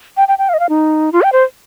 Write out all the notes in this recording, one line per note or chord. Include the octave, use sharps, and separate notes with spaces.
G5
G5
G5
F5
D#5
F5
D#4
F4
G5
C5